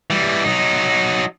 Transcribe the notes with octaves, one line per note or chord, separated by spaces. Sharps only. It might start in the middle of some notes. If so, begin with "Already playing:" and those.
E3 G3
F#3 D#4